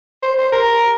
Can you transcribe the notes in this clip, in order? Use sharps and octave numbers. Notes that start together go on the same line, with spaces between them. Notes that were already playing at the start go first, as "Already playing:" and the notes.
C5
C5
A#4